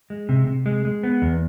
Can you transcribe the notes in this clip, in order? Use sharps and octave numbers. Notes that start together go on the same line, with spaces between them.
G#3
C3
C3
G#3
G#3
B3
E2